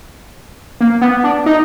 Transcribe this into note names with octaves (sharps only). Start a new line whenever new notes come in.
A#3
B3
D4
D#4